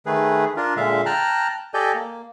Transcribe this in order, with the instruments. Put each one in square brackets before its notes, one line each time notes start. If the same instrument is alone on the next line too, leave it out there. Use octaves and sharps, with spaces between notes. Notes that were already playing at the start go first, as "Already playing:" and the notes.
[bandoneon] D#3 A3 G#4 B4
D4 F4 A#4
A#2 D3 G#3 E5 F5
G5 A5 A#5 F6 F#6
G4 A4 D5 D#5 G#5 G6
A#3